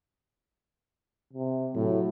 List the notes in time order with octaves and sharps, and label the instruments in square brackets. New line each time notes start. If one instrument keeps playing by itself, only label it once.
[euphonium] C3
[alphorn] A2 [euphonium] F#3